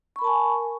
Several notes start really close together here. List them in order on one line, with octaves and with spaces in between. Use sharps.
C#6 B5 A#4 A5 G#5